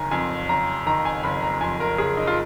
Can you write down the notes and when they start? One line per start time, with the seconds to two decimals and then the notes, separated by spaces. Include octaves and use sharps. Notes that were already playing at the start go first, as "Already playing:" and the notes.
Already playing: F#1 D#3 G#5 A#5
0.11 F2 G#5
0.49 F#1 A#5
0.86 D#3 A#5
1.05 G#5
1.23 F#1 B5
1.43 A#5
1.61 F2 G#5
1.80 A#4
1.98 F#1 G#4
2.17 D#4
2.27 F4